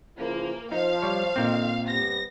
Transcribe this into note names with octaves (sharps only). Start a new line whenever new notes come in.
C#3 E3 F3 A#3
F3 D#4 F5
G3 C#5
A#2 D3 D#3 C4
C3 G3 B3 A#6